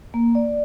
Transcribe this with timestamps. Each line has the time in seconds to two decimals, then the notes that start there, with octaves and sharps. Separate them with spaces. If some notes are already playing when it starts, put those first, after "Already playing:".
0.14 A#3
0.35 D5